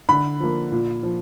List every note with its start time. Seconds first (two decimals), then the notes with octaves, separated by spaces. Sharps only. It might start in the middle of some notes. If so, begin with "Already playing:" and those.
0.09 D3 B5
0.40 F3 A#3
0.72 A#2
1.03 F3